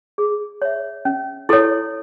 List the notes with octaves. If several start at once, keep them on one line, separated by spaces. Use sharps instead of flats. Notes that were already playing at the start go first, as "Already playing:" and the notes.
G#4
C#5 E5
C#4
E4 A4 C#5